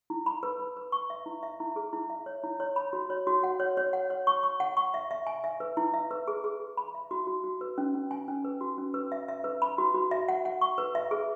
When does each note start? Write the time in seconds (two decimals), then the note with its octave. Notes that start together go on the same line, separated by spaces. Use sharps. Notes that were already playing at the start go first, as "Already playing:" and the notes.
0.10 E4
0.26 B5
0.43 B4
0.60 B4
0.77 B4
0.92 C#6
1.10 E5
1.26 E4
1.43 E5
1.60 E4
1.76 G#4
1.93 E4
2.10 E5
2.26 C#5
2.44 E4
2.60 C#5
2.76 B5
2.93 F#4
3.10 C#5
3.27 F#4
3.43 F#5
3.60 C#5
3.77 C#5
3.93 F#5
4.10 C#5
4.27 C#6
4.43 C#6
4.60 F#5
4.77 C#6
4.94 E5
5.11 E5
5.27 G#5
5.44 E5
5.60 B4
5.77 E4
5.94 E5
6.11 B4
6.28 G#4
6.44 G#4
6.60 G#4
6.77 B5
6.94 E5
7.11 F#4
7.27 F#4
7.44 F#4
7.61 B4
7.78 C#4
7.95 C#4
8.11 G#5
8.28 C#4
8.45 B4
8.61 F#4
8.78 C#4
8.94 B4
9.12 E5
9.28 E5
9.44 B4
9.62 B5
9.78 F#4
9.94 F#4
10.11 E5
10.28 F#5
10.45 F#5
10.61 C#6
10.78 B4
10.95 E5
11.11 G#4